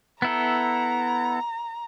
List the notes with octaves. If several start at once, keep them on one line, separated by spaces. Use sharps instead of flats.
B3 E4 A4 A#5